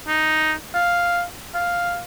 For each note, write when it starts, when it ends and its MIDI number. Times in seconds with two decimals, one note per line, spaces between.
0.07 0.54 63
0.74 1.23 77
1.54 2.02 77